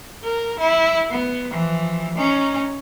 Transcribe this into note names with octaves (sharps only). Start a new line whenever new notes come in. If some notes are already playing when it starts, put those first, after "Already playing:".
A#4
E4
B3
E3 F3
C#4 D#4